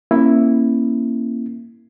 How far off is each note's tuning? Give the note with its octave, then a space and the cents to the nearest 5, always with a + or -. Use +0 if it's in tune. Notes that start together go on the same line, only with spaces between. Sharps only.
A#3 -5 C#4 -35 E4 +0